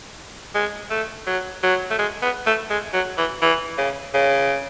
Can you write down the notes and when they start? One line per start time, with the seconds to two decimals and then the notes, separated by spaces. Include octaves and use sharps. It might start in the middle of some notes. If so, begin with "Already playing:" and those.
0.54 G#3
0.90 A3
1.26 F#3
1.63 F#3
1.90 A3
1.99 G#3
2.22 B3
2.47 A3
2.70 G#3
2.93 F#3
3.18 E3
3.42 E3
3.78 C#3
4.14 C#3